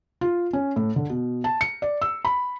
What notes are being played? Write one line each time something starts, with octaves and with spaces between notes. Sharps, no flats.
F4
C#4
A2
D3
B2
A5
C#7
D5
E6
B5